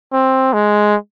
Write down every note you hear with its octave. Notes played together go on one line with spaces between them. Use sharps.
C4
G#3